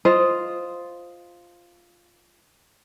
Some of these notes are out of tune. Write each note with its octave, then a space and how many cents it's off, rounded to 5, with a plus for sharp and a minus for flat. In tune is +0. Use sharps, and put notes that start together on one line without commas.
F4 +0 C5 +0 D#5 +0